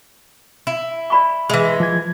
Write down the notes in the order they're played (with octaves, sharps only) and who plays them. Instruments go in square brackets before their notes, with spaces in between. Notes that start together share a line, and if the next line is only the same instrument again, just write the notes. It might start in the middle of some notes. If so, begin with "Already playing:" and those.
[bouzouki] E4
[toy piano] D5 B5 C#6
[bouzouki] E3 G#3 [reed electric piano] G#4 E5
[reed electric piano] F3 G#6